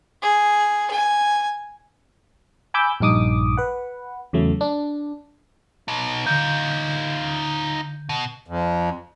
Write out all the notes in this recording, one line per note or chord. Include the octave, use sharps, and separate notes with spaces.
G#4
G#5
G#5 B5 D6 E6 G6
A#1 G2 D#4 D6 D#6
B4 F#5
E2 C#3 F#3 A3
D4
B2 D#4
D3 D#4 F4 G6
B2
F2